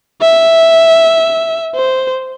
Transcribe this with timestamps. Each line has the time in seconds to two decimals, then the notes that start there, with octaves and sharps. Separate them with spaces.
0.21 E5
1.76 C5